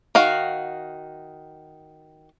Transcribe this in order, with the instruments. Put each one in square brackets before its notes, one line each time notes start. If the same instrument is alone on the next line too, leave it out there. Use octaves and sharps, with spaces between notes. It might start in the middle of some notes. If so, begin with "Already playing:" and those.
[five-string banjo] D#3 F#4 F5